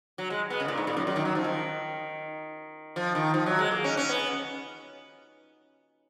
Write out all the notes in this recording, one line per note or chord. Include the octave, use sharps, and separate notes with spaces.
F#3
G#3
B3
C#3
A#2
G#2
A#2
F#2
F#2
D#3
F#3
F3
D#3
F3
D#3
F3
F#3
G#3
A#3
C#4
C#4
B3